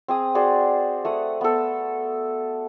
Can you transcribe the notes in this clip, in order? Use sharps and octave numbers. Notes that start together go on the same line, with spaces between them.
C4 G#4 D#6
F#4 G#4 C5 D5
A3 F#5 D#6
B3 A4